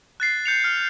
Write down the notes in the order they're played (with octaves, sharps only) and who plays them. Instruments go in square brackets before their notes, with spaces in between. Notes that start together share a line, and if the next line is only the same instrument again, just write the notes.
[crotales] F#6 A6 C7
G6 C#7 F7
F6